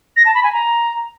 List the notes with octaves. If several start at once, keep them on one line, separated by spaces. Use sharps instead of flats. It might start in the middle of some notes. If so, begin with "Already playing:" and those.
A#6
A5
B5
G#5
A#5